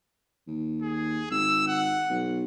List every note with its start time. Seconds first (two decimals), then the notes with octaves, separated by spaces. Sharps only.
0.48 D#2
0.82 G#4
1.31 G#1 E6
1.67 F#5
2.09 B1